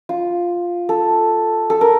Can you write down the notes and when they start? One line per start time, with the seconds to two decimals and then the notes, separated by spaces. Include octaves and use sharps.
0.09 F4
0.89 A4
1.70 A4
1.81 A#4